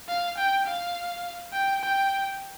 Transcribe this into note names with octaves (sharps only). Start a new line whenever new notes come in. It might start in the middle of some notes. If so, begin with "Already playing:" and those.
F5
G5
F5
G5
G5